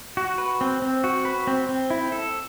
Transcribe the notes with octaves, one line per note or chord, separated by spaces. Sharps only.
F#4
B4
C4
C4
F#4
B4
C4
C4
E4
A4